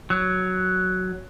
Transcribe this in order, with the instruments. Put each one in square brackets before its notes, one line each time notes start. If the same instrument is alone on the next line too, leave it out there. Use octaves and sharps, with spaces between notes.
[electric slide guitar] F#3